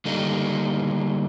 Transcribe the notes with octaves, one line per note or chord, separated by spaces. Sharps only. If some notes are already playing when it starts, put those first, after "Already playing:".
D3 G3 A#3 D#4